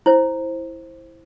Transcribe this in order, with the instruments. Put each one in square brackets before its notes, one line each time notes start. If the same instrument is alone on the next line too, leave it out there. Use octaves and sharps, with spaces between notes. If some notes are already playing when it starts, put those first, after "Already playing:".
[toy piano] E4 C5